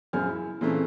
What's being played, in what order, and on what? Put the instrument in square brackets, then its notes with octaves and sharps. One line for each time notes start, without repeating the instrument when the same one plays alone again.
[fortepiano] A#1 F#2 C#3 G#5 F6
E4
A#2 C#3 E3 A3 C4 C#4